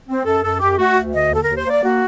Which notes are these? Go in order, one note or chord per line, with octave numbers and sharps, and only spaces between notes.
C4
F#2 A4
F#2 A4
F#2 G4
A3 F#4
D2
D3 D#5
D#2 A4
D#2 A#4
C5
A#3 D5
A#3 F#4